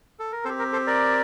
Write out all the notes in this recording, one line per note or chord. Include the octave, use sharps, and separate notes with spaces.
A4
A#4
C4 G4 A4 C5
A#4
A4 C5
A#4 D5